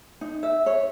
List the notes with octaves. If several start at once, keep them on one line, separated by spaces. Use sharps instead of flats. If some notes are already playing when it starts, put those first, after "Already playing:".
D#4
E5
C#5